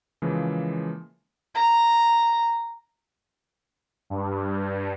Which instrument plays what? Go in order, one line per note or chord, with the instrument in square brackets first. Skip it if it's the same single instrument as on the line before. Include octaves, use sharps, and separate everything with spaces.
[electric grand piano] C#3 E3 F3 G#3 A#3
[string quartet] A#5
[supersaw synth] G2